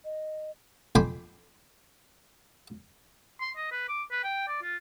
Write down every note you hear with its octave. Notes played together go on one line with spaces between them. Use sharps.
D#5
F2 G5 G#5 B5 C6 D6
C6
D#5
B4
D6
B4
G5
D5
F4